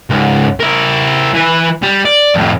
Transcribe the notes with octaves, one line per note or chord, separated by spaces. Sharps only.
C#2 G#2
E4 A#4
E3 B4
G3
D5
F2 A2